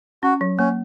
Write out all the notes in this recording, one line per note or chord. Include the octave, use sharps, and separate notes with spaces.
C#4 F#4
F#3
A#3 C#4